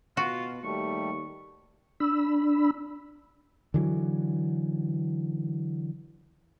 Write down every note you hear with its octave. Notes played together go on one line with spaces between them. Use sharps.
B2 F4 F#4
D#2 G3 A3 C#6
D4 B5 E6
D3 E3 F#3